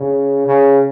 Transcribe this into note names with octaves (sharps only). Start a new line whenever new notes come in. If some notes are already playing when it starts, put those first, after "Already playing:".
Already playing: C#3
C#3